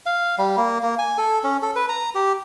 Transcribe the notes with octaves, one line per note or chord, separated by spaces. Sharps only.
F5
G3
A#3
A#3
G#5
A4
C#4
A4
B4
A#5
G4